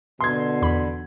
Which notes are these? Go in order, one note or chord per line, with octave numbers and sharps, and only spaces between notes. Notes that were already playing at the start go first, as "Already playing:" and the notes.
B2 D3 C6 G#6
E2 B5